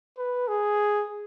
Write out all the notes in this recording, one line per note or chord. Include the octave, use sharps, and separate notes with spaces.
B4
G#4